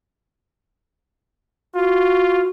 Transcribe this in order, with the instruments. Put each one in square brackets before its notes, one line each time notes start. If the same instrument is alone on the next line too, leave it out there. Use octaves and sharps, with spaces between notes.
[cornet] F4 [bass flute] F#4